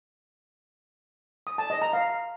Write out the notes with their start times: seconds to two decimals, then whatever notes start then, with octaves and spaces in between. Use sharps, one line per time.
1.47 D#6
1.58 A5
1.70 D#5
1.82 A#5
1.93 F5